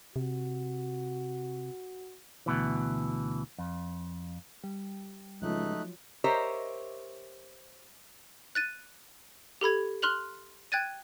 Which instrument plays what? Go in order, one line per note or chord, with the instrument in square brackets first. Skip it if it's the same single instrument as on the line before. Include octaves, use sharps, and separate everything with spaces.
[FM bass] C3 [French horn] F#4
[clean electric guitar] D2 B2 E3
F2
[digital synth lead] G3
[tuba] C#2 [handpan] F3 F#3 F4 [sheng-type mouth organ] A3 D#4 F#6
[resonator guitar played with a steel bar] G4 A#4 C5 C#5 D#5 E5
[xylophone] F#6 A6 D#7
G4 A4 B5 G#6
C6 F6 F#6 F7 F#7
G5 F#6 G#6 A6 D#7